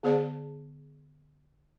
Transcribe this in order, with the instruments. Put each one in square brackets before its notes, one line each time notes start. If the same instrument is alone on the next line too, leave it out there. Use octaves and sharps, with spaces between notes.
[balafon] D3 B3 G#4 C5 D5 A5